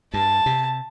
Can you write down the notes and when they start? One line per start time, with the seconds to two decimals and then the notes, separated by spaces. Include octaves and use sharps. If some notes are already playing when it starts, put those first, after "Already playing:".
0.14 G2 A5
0.46 C3